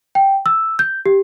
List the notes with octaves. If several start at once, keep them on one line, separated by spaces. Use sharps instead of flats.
G5
E6
G6
G4